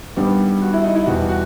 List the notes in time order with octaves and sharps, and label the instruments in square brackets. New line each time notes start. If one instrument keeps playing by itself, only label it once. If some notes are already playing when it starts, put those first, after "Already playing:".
[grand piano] G2 D#3 G3 B3
F#4
E4
D#4
E4
E2 B2 G3 F#4
F#4